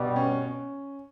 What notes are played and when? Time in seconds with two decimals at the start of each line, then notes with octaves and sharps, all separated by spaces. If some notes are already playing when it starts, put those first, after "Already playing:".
Already playing: G2 B2 G3
0.16 C#4
0.41 C#4